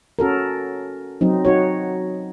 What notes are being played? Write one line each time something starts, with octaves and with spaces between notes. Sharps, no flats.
C#4 F#4 A4 A#4
F#3 C4 D#4
D#4 F#4 C#5